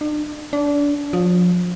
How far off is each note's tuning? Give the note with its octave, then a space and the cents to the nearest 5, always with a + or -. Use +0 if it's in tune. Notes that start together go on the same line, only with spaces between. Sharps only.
D4 +40
D4 -25
F3 +35